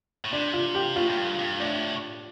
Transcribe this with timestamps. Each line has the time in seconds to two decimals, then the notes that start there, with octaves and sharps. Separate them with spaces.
0.25 A2
0.32 C3 D4
0.53 F4
0.75 G4
0.96 A2 F4
1.10 A2
1.17 G2
1.39 G2
1.60 A2 D4